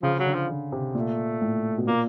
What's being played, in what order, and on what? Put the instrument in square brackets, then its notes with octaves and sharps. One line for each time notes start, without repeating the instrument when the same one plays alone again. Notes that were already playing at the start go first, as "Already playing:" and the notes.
[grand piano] C#3 [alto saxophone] F3
[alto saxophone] F#3
[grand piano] D3
[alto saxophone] F3
[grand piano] D3
C3
[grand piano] A#2 [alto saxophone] A3
[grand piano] A2
B2
[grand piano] A#2 [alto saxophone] A#3